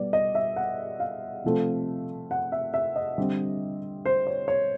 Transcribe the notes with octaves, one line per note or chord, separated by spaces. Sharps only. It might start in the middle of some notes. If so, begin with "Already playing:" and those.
Already playing: B2 G3 B3 D5
D#5
E5
F#5
F5
C3 F3 A3 C4
F#5
E5
E5
D#5
D3 G3 C4
C5
C#5
C#5